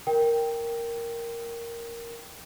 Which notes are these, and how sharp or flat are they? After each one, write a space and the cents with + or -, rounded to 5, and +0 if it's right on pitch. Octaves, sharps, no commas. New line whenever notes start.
A#4 +0 G5 +0